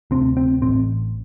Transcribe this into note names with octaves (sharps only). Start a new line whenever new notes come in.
D2 C3 C4
C4
A1 A2 C4